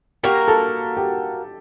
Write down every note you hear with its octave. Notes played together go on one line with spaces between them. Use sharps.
A#3 F#4 G4 A#4
A4
G4